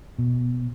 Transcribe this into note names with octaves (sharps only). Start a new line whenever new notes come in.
B2